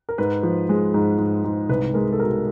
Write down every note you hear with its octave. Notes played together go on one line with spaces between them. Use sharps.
A#4
G#2 B4
F3
G#3
G#2
G#2
G#2
C2 B4
G#3 A#4
A4
B2 A#4